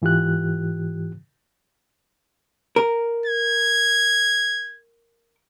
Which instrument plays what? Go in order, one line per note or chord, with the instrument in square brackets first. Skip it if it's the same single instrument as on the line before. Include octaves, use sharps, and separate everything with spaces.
[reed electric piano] G#2 E3 F4 G4 F#6
[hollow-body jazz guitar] A#4
[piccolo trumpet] G#6